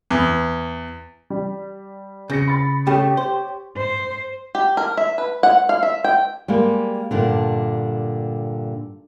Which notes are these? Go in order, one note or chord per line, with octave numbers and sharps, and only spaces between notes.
E2
G3
C#3 G6 A#6 C#7
B5 A6
C#3 A3 G4 C#5
C5
C5
G4
A#4
E5
B4
F#5
F5
E5
G5
G3 G#3 A#3
G2 A#2 D3